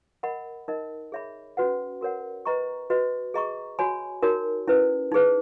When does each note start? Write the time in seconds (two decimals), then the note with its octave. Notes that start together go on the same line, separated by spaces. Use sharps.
0.23 A#4 D#5 F#5 B5
0.68 D#4 A#4 D#5
1.12 G#4 C#5 E5 B5
1.57 C#4 F#4 B4 F#5
2.01 F#4 A#4 C#5 F#5
2.45 B4 D#5 A#5 C#6
2.90 F#4 B4 D#5
3.34 G#4 D#5 A#5 C#6
3.79 F#4 C#5 G#5 B5
4.22 D#4 F#4 A#4 C#5
4.67 C#4 E4 B4
5.12 D#4 G#4 B4